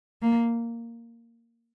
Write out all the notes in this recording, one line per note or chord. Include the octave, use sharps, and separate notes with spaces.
A#3